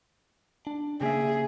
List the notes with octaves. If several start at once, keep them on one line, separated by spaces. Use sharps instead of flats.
D4
C#3 A#3 G#4 E5